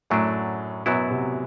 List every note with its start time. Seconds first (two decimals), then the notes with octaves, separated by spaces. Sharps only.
0.10 F#2 A2 F#3 A3 D4
0.86 F#2 B2 F#3 B3 E4
1.11 C3